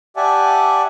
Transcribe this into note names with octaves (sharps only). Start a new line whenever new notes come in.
G4 D5 E5 F#5 G#5 A5